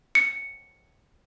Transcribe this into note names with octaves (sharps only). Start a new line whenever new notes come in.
C#7